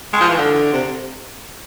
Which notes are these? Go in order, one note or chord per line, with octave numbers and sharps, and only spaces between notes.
G#3
F3
E3
D3
C3